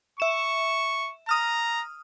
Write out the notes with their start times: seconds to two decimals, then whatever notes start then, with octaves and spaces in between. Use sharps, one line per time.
0.20 E5 C#6 E7
1.29 A#5 D#6 F6